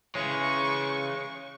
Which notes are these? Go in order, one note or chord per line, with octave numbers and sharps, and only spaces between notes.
C#3 E3 G#3 G#4 C#5 C#6